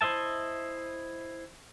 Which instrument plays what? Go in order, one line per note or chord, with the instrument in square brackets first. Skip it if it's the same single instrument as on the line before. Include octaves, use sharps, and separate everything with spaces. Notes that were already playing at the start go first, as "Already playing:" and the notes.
[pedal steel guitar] E4 C5 D#5 E5 A5